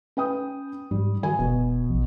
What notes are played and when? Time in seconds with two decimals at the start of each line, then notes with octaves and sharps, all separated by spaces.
0.17 C#4 B4 G5 D#6
0.91 G#2 G3
1.23 D#3 F#4 G#5
1.39 F1 B2
1.89 A#1